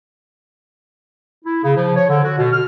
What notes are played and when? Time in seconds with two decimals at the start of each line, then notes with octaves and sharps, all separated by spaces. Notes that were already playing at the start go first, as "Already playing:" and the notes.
1.45 E4
1.64 C#3
1.77 F3
1.96 C#5
2.10 D3
2.24 F#4
2.38 B2
2.53 F6